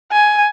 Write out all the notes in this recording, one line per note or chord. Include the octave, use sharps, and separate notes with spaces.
G#5